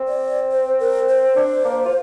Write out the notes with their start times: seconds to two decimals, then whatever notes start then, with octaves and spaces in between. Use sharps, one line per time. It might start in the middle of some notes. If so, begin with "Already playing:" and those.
Already playing: C4
0.08 D5
0.51 C5
0.80 A#4
1.09 C5
1.36 D4
1.65 A#3
1.85 F4